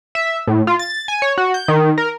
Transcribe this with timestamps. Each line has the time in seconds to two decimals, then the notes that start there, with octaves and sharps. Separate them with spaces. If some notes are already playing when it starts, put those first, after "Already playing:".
0.15 E5
0.47 A2
0.67 F4
0.79 A6
1.08 G#5
1.22 C#5
1.38 F#4
1.54 G6
1.68 D#3
1.98 A#4